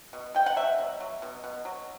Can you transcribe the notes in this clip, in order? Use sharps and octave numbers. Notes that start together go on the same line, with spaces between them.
B2
B2 G5
F#5
F#3 E5
B2
F#3
B2
B2
F#3